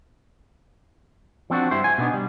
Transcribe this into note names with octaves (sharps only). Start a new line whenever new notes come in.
F3 C4 D4 F#4
G2 E4 G4 C5
C5 F5 G#5
B2 B3 D4 D#4
G3